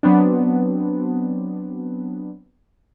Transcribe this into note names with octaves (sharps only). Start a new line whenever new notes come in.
F#3 B3 C4 D4